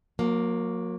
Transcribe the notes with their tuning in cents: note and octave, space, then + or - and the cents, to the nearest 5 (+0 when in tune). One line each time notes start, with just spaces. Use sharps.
F#3 -35 A#3 +0